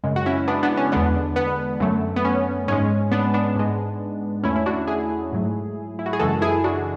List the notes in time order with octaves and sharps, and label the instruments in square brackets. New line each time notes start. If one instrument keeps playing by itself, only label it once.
[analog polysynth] F#2 C#3 G#3
F#4
C#4 E4
B3 D4
B3 D4
C#4
E2 D3 G#3 B3 D4
B3
F#2 D3 F#3 A3
B3
C#4
G#2 G#3 C#4
B3 D4
B3 D4
G#2 G#3
E2 D3 A3 C#4 E4
E4
D4 F#4
E4 G#4
G#2 F#3 A3
E4
F#4
G#4
F#2 C#3 E3 G#3 F#4 A4
E4 G#4
D4 F#4